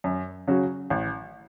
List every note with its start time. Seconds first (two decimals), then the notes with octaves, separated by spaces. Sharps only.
0.04 F#2
0.48 C#3 F#3 C#4 F#4
0.90 A1